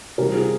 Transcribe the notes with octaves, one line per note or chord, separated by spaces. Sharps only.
C3 G3 G4 A#4
F4 G#4